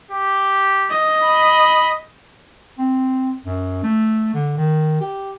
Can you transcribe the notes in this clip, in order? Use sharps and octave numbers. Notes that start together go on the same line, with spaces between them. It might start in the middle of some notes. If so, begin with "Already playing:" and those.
G4
D#5
B5
C4
F#2
A3
D3
D#3
G4